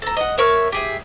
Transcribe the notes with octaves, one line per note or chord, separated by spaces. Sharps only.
A4 A#5
D#5 F#5
A#4 C#5 E5 F5
G4 G#4 E5